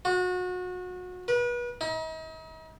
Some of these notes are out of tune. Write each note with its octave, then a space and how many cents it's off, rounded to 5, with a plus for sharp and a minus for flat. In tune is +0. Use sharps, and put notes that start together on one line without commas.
F#4 -30
B4 -35
D#4 +40